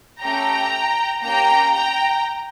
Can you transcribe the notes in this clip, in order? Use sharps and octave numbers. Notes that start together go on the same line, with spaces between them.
A3 C#4 G4 G5 A#5
A#3 C#4 G4 G5 A#5
G5 A#5